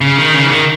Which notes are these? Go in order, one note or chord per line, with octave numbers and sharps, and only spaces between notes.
C#3
D#3
C#3
E3
D#3